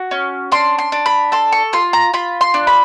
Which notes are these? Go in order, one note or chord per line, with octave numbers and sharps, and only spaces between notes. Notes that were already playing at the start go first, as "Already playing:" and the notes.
Already playing: F#4
C#4
D4 C6
C6
D4
B5
A4 C6
C#6
F4 C6
A#5
F4 B5
C6
D4
B5